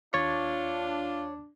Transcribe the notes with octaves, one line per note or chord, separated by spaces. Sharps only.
D#2 D4 F4 C#5 G#6 A6